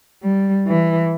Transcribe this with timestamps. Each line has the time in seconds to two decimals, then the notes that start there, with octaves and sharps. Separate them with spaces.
0.24 G3
0.67 E3